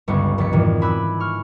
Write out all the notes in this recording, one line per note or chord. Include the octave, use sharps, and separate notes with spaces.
G1 C#2 B3 C#6
F1 C#2 G3 D5 B6 C#7
F2 G#2 C3 D#3 E3
G#5 B5 D6 E6 F#6
C#6 F6